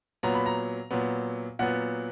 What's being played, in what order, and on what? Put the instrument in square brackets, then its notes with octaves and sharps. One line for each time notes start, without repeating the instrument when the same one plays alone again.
[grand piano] A#2 F#3 B3 A#5
B5
A#5
A#2 F#3 B3
A#2 F#3 B3 F#5